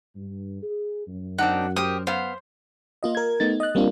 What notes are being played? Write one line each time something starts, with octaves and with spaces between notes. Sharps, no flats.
G2
G#4
F#2
C4 D4 D#4 F#5
G4 A#4 C5 D#6
B3 C5 F5
A#3 F4 D#5
A#4 G#6
A3 B3 D#4 A6
D#5 F#6
G3 A#3 C4 D4 F4